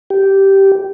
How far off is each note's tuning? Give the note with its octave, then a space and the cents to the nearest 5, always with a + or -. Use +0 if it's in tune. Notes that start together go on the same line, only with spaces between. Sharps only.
G4 -10